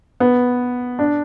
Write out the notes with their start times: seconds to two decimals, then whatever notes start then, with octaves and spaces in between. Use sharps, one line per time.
0.20 B3
0.99 D4